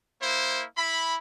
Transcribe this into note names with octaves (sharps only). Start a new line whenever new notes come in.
A#3 E4 C5
E4 B5